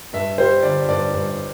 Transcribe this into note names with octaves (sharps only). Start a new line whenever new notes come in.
G2 E5
G3 C5
D3 D5
G2 D5
G2